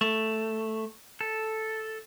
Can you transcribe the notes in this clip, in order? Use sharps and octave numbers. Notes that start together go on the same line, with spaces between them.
A3
A4